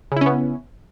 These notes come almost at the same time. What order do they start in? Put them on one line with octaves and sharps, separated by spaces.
C#3 E4 C#4 B3